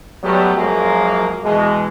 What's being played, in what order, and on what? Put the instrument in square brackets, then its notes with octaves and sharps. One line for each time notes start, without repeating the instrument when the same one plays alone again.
[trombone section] F#3 G3 A3 B3 G4
F#2 F3 F#3 G#3 A#3
B2 E3 G#3